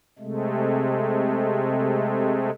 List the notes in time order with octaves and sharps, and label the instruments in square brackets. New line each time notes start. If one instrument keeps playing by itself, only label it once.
[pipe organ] C3 G#3 A3